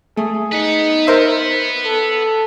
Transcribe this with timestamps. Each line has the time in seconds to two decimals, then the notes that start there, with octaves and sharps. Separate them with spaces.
0.17 A3 G#4
0.52 D#4 B4 F#5
1.07 A#4 C5 E5
1.85 A4